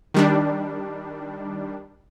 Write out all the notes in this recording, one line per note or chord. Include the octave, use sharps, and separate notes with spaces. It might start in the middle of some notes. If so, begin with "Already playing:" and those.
D#3 G3 D4